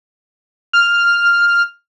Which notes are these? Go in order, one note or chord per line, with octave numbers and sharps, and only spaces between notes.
F6